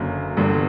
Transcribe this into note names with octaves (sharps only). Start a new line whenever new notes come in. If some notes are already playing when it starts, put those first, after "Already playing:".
Already playing: F#1 F#2 D3 F#3 A#3
G1 G2 D3